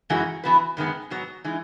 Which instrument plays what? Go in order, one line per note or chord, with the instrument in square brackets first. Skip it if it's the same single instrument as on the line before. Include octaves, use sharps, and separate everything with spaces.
[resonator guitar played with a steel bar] F#2 E3 G#3 D#4 F#4
E3 B3 F#4 B4
F#2 D#3 G#3 B3
G#2 F#3 B3
E3 G#3 D#4